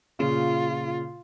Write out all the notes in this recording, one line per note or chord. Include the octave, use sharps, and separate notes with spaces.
A#2 C#3 F4